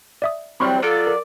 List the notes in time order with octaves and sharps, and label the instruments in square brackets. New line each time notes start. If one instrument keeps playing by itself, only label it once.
[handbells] D5 E5 D#6
[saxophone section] E3 F#3 G3 [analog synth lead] C4 [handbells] B5 C#6 F6
[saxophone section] F#3 F4 [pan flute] A4 [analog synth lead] D5
[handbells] A#4